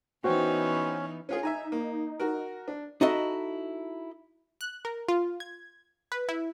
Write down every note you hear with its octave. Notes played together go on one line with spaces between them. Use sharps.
E3 B3 C#4 D#4 F#4 C5 G5
C#4 F4 G#4
D#4 E5 G#5 A#5
A#3
F#4 A#4
D4
D#4 E4 F#4 A4 D#5 E5
F#6
A#4
F4
G#6
B4
E4